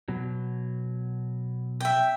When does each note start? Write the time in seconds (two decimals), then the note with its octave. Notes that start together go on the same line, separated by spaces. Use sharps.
0.08 B2 F#3
1.80 E5 G5